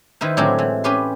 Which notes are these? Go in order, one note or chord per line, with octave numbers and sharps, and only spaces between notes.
D#3 E4 B4 C5
A2 D3 F#3 G#3 C4 G4
E3
C#4 G4 B4 C6